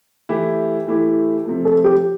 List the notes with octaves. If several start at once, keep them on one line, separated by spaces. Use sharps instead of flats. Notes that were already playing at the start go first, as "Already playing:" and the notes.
E3 A3 E4 G4
E3 A3 E4 G4
C3 F3 A3
A4
G4